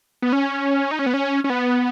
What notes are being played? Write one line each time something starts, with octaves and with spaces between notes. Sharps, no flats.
B3
C#4
D#4
C#4
B3
C#4
C#4
B3